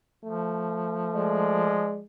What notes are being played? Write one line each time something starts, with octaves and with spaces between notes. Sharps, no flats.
F3 A3
G#3 D5